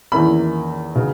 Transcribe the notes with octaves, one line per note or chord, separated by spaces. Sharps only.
E2 D#3 A#3 C#4 E4 B5
C#3 F#3 B3 D#4